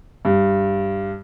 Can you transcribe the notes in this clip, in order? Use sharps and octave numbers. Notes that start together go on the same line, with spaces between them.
G2